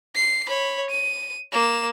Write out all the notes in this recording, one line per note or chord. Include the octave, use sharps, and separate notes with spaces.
C7
C#5 B5
D#7
A#3 E7